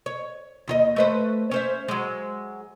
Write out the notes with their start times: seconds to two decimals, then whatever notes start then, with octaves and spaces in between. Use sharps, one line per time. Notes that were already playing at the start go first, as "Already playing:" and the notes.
0.06 C#5
0.68 D#2 F4 D#5
0.96 A3 B4 C5
1.51 C#4 C5 E5
1.88 F#3 G#3